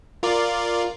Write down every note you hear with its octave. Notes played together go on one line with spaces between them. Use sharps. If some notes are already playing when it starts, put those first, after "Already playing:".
F4 A#4 D5